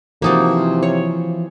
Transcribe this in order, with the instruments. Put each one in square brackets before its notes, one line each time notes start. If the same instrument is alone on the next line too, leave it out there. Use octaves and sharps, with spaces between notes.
[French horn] C3 [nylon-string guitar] E3 F3 F#4 [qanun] A#3 D#4 A5
[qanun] C#5